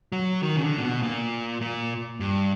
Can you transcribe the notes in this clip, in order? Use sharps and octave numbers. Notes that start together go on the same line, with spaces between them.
F#3
D#3
C#3
D3
A#2
B2
A#2
A#2
G2